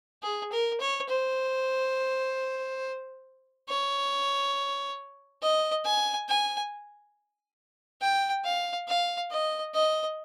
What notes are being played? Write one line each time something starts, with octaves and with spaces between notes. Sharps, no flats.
G#4
A#4
C#5
C5
C#5
D#5
G#5
G#5
G5
F5
F5
D#5
D#5